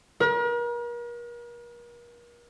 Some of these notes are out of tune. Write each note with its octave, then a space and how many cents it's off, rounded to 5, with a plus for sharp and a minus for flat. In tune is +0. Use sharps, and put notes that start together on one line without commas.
A#4 +40